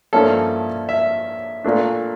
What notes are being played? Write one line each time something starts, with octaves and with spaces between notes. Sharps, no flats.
G2 F3 A#3 C#4 E4 A4
E5
A#2 A3 D4